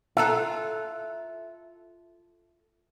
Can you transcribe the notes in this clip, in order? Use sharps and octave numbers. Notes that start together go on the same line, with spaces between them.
F4 A4 E5 A#5 E6 F#6